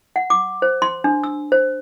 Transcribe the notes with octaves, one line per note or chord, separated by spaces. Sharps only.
F#5
D6
C5
C6
D4
E6
C5